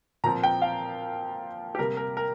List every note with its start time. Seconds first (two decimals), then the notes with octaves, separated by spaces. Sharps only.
0.24 A#2 F3 C4 A#5
0.44 G5
0.62 F5
1.75 G4
1.78 C3 G3 A#3 A#4
1.97 A#4
2.17 A#4